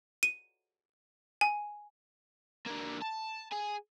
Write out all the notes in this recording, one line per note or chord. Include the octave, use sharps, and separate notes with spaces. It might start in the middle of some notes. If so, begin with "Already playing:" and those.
D#7
G#5
D3 A#3
A5
G#4 G#5